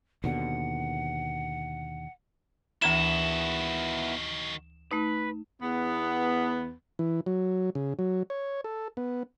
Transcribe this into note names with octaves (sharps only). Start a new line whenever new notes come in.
D#2 B2 D3 F#5
D2 D#3 E3 B3 E4 F#4 A#5 E7
A3 D#4 B4
E2 B3
E3
F#3
C#3
F#3
C#5
A4
B3